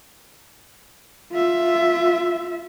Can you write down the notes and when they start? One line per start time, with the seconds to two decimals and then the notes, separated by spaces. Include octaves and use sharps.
1.32 F4 E5